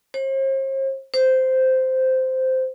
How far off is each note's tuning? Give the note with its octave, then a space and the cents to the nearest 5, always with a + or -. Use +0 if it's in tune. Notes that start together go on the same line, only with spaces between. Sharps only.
C5 +45
C5 -10